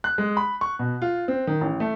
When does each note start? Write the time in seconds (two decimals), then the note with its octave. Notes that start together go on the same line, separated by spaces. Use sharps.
0.04 F#6
0.18 G#3
0.37 B5
0.61 C#6
0.79 B2
1.02 F4
1.28 C4
1.47 D#3
1.61 A1
1.80 A3